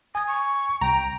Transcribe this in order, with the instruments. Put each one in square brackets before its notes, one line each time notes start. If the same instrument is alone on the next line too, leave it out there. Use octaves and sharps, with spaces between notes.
[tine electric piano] G#5 G#6 [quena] D#6
[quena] C#6
[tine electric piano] C2 [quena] G5 [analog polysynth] A#5